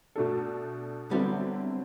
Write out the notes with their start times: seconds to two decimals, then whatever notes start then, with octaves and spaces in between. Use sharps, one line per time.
0.16 B2 A3 D4 A4
1.11 D3 F#3 G3 B3 C4 E4 A4